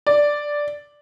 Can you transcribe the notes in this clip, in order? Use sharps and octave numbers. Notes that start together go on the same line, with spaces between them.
D5